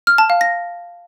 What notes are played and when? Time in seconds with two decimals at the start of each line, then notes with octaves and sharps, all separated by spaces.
0.07 F6
0.18 A5
0.30 F5
0.41 A#6